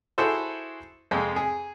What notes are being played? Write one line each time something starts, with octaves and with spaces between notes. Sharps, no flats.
E4 F#4 G#4 A4 C5
F2 C3 G#3 C4
G#4